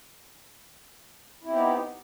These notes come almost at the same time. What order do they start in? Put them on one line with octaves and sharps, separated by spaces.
E4 C4 G4 B3 D#4